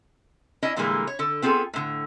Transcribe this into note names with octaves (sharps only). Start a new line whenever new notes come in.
C#4 D4 E4 D#5
A#2 D3 E3 G3 G#3 A#3
C#5
D3 A4
B3 C4 F4 G#4 A4
A2 D3